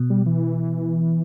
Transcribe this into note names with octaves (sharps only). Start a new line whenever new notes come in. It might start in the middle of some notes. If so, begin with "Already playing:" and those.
Already playing: B2
G3
E3